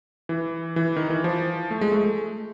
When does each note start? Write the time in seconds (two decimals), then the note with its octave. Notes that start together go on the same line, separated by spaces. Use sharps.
0.29 E3
0.76 E3
0.96 D#3
1.10 E3
1.24 F3
1.71 A3
1.81 G#3
1.92 A3